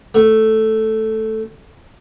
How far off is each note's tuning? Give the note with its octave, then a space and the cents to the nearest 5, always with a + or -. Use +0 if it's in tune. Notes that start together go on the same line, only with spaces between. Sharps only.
A3 +0